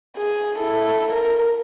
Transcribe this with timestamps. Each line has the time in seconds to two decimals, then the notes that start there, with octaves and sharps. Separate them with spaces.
0.17 G#4
0.57 E4 A4
1.12 A#4